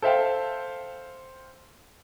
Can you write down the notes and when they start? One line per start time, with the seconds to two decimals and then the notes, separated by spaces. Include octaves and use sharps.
0.02 A4 C5 E5 F5 G5